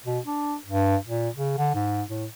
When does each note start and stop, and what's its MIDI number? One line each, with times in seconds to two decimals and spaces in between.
0.06 0.19 47
0.26 0.56 62
0.66 0.97 43
1.07 1.29 46
1.36 1.55 49
1.58 1.70 50
1.74 2.03 44
2.08 2.26 45